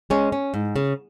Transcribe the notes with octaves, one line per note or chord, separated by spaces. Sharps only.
G#3 C#4
C#4
G#2
C#3